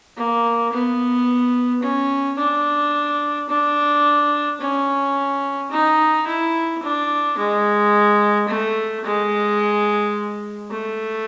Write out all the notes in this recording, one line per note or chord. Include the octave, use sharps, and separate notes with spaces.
A#3
B3
C#4
D4
D4
C#4
D#4
E4
D4
G#3
A3
G#3
A3